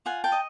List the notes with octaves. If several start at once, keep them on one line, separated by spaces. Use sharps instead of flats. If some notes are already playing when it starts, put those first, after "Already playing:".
F4 F#5 G#5
G5 A5
D#5